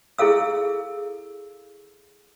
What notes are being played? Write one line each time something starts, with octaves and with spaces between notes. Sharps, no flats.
E4 G#4 A4 F5 E6